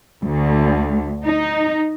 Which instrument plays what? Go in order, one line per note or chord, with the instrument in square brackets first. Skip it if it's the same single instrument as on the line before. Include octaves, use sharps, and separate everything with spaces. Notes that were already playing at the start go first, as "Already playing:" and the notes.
[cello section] D2
D#4